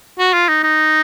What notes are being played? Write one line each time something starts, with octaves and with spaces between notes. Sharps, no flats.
F#4
F4
D#4
D#4